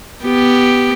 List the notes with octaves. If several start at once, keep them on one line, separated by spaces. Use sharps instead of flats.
B3 G4